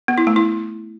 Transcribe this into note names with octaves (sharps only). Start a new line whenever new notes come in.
B3
E4
A3
E4